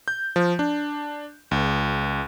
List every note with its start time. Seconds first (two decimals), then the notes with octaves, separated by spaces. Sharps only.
0.08 G6
0.36 F3
0.59 D4
1.51 C#2